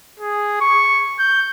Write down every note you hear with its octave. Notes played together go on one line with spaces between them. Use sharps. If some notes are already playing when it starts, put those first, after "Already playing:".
G#4
C#6
G6